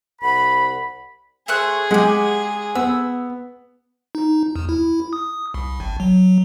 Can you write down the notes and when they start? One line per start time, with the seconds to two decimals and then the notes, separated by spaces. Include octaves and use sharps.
0.22 C2 F#5 B5
1.48 A3 G#4 C5 F#6
1.91 G#3 G4 F#5
2.75 B3 E6
4.15 D#4
4.56 E2
4.69 E4
5.13 D#6
5.54 C2
5.80 G#1
6.00 F#3